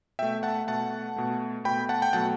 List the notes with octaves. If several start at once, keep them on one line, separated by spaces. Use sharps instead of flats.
B2 A3 E5 G5
F#5 A5
B2 A3 F#5 A5
B2 A3
B2 A3 G5 B5
F#5 A5
G5
B2 F#3 A3 F#5 A5